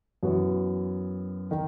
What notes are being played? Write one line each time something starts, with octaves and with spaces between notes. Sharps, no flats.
F#2 E3 B3 F#4
D#3